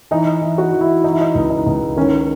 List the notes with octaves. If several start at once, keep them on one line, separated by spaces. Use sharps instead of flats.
E3 D#4
E3
F#4
E3
E4
E3 D#4
E4
D#4
C#2
D#4
C#2
D#3 C#4